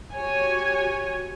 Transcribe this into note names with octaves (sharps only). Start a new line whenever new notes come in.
F#4 G4 C#5 G#5